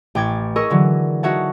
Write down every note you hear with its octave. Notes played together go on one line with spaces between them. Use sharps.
A1 G5 D6 G#6 A6
G#4 A#4 D#5 C#6 E6
D3 E3 F#3 D4
D#4 F#4 C#5 E5 F#5 A5